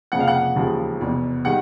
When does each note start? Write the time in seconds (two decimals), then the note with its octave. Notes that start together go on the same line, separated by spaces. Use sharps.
0.12 F1 F2 C#3 F3 A#3 F#5
0.20 F5
0.28 F#5
0.56 E1 D#2 C#3 F3
1.00 F1 E2 B2
1.45 D#3 G3 F#5